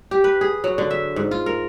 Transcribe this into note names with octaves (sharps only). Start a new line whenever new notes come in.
G4
B4
G#4
F#3
D3
E5
G#2
F4
A#4